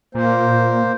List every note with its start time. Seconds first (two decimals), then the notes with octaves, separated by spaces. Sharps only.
0.15 A#2 A#3 C5